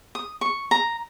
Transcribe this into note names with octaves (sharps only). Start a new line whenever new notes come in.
D#6
C#6
A#5